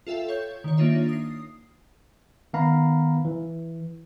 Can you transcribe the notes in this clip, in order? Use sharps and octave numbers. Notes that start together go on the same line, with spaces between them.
F4 A4 E5 F5 G5
C#5 G6
D#3 C#5
A#3 D4 D#4 F4 C#5 E5
D#6 C7
D#3 B3 F5 A#5 B5
E3